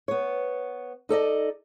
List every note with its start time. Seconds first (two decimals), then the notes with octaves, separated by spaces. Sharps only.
0.08 B3 C#5
1.09 D#4 A4 D5 D#5